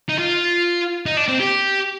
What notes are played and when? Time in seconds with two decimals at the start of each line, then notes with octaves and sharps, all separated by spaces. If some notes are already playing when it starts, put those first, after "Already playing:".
0.09 D#4
0.19 F4
1.06 D#4
1.17 D4
1.28 C4
1.40 G4